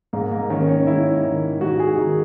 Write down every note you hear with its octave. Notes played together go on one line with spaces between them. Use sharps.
G#2 A#3
A#3
D#3 C#4
C#4
G#2 E4
D#3
G#2 F#4
G#4
D#3